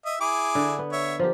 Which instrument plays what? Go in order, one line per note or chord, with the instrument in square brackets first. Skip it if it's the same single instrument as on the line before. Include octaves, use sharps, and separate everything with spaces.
[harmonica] D#5 E5
E4 G#4 D6
[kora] D3
B3
[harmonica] C#5 E5
[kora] F3 A#3 G4